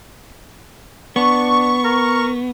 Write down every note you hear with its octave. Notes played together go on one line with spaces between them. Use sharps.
B3 D4 C#6
A#4